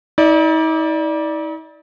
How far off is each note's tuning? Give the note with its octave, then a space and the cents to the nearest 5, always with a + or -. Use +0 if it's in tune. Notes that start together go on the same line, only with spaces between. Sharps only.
D#4 +45 D5 +0